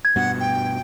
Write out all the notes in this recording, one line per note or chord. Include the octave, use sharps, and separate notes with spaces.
G#6
G2 B2 F#5
G5